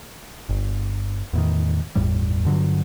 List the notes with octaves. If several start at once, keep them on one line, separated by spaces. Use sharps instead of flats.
G1
E2 A2 D#3
G1 E2 A2 G3
G2 D3 F3 F#3